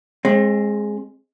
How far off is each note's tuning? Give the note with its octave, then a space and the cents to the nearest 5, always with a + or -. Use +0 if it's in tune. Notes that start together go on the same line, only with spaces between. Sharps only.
G#3 +0 C4 +35